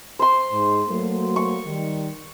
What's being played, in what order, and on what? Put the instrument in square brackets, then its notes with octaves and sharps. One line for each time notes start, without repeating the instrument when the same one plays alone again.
[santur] C5 C6
[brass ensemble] G#2
F#3 A3 A#3
[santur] C#6
[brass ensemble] D#3 G3